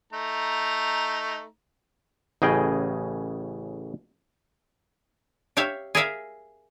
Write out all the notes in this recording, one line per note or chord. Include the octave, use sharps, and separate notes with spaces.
A3 D#4 A#5
A1 A2 C#3 G#4 D#5 G5
G4 C#5 E5 F5
G#4 A#4 E5 F5